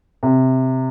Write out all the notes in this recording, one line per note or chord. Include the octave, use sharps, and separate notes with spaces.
C3